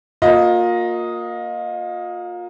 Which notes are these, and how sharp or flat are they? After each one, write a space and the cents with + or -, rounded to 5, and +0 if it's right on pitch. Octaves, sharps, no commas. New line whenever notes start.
A#3 +0 F4 +30 D#5 +5